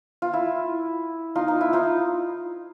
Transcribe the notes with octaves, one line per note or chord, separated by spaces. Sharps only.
F4
E4
D#4 F4
D#4
E4
D#4 F4